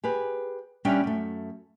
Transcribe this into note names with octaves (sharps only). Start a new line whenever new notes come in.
G4 G#4 B4
G3 C#4 D4 G4 E5 G5
F#2 A3